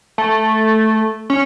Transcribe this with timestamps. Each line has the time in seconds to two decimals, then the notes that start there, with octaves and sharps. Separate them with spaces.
0.18 A3
1.30 C#4